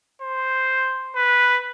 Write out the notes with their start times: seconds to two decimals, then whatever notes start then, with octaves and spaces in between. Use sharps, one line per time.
0.22 C5
1.16 B4